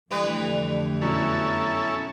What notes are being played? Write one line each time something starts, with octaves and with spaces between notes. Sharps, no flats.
F2 D3 E3 G3 A3 B4
F#2 B2 C#4 E4 A4